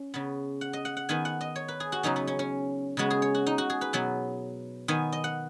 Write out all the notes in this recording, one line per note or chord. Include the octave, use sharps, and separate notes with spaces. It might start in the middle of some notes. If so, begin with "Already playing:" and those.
Already playing: C#4
C#3 B3
F#5
D#5
F#5
F#5
D#3 B3 G#5
F#5
D#5
C#5
B4
G#4
F#4
C#3 F#3 B3 D#4
B3
C#4
C#4
C#3 G#3 B3 F#4
G#4
C#5
F#4
D#4
F#4
G#4
B4
B2 F#3 B3
D#3 B3 G#5
D#5
F#5